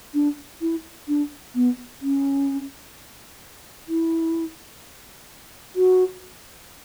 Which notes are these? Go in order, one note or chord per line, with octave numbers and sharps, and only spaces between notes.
D4
E4
D4
B3
C#4
E4
F#4